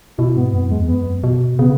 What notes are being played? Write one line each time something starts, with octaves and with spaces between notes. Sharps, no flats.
B2 E4
G#2 B3
F#2 B3
E2 G#3
F#2 B3
B2
C#3 B3